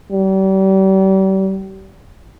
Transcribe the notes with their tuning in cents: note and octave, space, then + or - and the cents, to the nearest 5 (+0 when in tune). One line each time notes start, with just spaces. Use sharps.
G3 -35